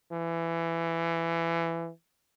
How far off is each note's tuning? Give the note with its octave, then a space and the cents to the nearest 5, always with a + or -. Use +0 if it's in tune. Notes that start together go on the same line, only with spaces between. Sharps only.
E3 +20